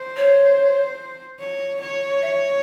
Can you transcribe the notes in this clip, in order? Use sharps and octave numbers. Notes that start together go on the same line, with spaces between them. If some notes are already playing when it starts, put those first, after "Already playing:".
Already playing: C5
C#5
C#5
C#5
E5